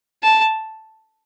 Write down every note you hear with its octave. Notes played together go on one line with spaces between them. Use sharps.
A5